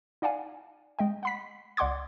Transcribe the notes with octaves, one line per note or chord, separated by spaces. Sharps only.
D#4 D5 F5 F#5 G#5
G#3 D#5 G5
F#5 B5 B6
C#2 D5 F#5 C6 D6 G#6